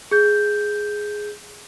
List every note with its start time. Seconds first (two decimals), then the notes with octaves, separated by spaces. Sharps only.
0.11 G#4 G6